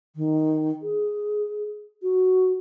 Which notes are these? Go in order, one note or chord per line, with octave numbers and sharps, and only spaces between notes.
D#3
G#4
F#4